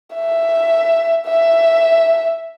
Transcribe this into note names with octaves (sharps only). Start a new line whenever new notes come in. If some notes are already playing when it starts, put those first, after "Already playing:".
E5
E5